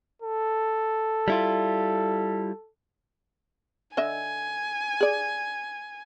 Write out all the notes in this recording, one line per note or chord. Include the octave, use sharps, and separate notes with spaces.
A4
G3 E4 F4
D3 D#5 E5 G#5
G#4 D5